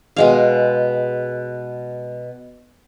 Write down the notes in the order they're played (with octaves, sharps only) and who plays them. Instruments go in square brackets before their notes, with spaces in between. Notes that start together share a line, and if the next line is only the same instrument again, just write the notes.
[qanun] B2 G#3 F5